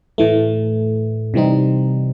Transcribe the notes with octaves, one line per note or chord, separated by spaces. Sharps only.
A2 E3 A3
C3 E3 G3 C4 D#4